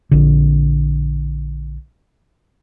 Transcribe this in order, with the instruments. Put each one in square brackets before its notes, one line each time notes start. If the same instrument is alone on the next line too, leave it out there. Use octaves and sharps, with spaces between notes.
[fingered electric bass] A#1 D3